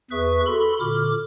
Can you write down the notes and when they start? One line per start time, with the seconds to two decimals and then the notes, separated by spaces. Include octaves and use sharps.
0.11 E2 G#4 B4 E5 C#6
0.46 F#4 A4 B5 C6
0.80 A#2 D3 D6 F6